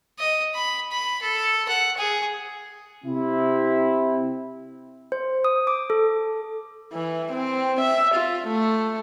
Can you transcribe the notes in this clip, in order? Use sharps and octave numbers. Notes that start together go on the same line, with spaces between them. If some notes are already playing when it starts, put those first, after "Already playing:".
D#5
B5
B5
A4
F#5
G#4
C3 C4 E4
C5
D#6
D6
A4
E3
C4
E5
F4
A3